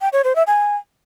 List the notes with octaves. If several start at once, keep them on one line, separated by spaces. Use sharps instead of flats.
G5
C#5
C5
E5
G#5